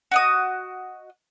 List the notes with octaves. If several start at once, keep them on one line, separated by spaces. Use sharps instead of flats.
F#4 D#5 D#6